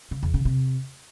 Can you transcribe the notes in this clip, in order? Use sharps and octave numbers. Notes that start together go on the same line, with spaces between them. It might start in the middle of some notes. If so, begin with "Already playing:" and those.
C#3
E2
C#3
C3